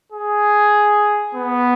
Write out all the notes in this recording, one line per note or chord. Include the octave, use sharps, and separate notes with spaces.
G#4
B3